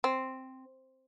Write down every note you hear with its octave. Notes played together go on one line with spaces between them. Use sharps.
C4